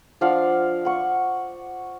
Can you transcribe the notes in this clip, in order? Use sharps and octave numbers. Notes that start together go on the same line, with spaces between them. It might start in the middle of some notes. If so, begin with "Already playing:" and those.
F3 D4 F5 F#5
F#5 C#6